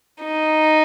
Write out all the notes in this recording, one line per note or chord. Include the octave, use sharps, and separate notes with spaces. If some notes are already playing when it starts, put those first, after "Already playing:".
D#4